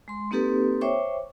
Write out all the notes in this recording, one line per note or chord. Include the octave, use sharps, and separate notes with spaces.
G#3 C6
A#3 C4 D#4 G4 A4 B4
C5 C#5 E5 G5 C#6 D6